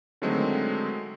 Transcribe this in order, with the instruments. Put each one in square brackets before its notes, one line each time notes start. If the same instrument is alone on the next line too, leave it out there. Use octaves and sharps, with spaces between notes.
[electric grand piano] D3 D#3 F#3 G#3 A3 C4